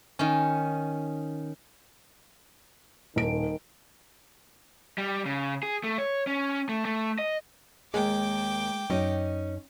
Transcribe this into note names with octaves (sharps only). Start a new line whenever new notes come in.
D#3 C#4
D#1 D#3 D7
G3
C#3
G#4
A3
C#5
C#4
A3
A3
D#5
D#2 G#3 A#3 G5 D6
F#2 C#4 D#4 D#5